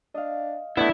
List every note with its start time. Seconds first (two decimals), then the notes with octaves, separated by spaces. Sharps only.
0.14 D4 D#5 F5
0.77 A3 B3 D4 E4